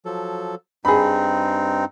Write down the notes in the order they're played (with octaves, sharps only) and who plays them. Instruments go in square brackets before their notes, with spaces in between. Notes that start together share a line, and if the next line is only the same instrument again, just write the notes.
[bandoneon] F3 F#3 A4
[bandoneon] G2 C4 D#4 [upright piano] G#4 B5